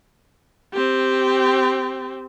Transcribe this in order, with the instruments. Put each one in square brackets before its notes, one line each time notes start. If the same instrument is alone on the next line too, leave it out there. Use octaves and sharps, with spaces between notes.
[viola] C4 G4